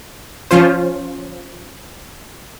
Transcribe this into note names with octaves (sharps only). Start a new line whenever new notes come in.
F3 C#4 F4 C5